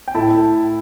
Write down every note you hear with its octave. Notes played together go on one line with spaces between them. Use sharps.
G5
A2 A3 E4 A5